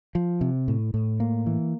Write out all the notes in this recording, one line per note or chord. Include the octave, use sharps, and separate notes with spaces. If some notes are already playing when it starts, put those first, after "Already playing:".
F3
C3
A2
A2
A#3
E3